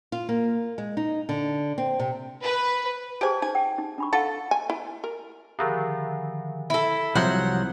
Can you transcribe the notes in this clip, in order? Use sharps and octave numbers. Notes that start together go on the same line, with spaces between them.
F4
A#3
G#3
D#4
D3
C4
C3
B4
G4 G#4 C5 G#5 A5
D#4 G#5
G5
D#4
D4 B5 C#6
A4 F5 F#5 A5
G#5
E4
A#4
D3 D#3 F3
E4 A4
C2 F3 F#3 F#5 G6